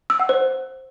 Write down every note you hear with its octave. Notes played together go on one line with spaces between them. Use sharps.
E6
F#5
C5